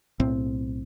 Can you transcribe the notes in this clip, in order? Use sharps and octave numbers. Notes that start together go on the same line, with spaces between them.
B1 A2 C4